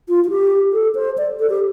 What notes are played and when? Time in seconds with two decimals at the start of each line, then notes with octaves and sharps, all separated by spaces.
0.09 F4
0.24 F4
0.30 G4
0.73 A4
0.95 C5
1.18 D5
1.39 A4
1.50 G4